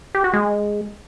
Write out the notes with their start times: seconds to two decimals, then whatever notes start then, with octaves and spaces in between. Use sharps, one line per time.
0.15 G4
0.24 F#4
0.34 G#3